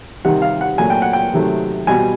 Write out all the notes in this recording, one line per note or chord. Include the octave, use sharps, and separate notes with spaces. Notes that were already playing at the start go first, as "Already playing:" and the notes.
C3 D#3 G3 F#5
F5
F#5
A#2 F#3 A3 G#5
G5
F#5
G5
C3 D#3 F#3 A3
B2 G3 G#5